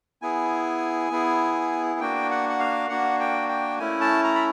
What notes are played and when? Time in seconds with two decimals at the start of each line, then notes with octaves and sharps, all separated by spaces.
0.22 B3 E4 G#4 G#5
1.11 B3 E4 G#4
2.00 A#3 D4 F#4 G5
2.31 F#5
2.49 F#5
2.60 F5
2.89 A#3 D4 F#4 F#5
3.20 G5
3.48 G5
3.79 A3 C#4 E4 G#5
4.01 A5
4.24 A#5
4.35 B5